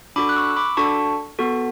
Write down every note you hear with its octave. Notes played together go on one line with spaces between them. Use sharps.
D4 F#4 A4 B5 D6
F#6
C#6 E6
E6
B5 D6
D4 F#4 A4 A5 C#6
B3 F#4 A4